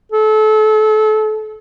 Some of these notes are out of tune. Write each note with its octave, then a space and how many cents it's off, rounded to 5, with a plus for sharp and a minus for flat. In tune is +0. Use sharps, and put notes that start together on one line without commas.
A4 -30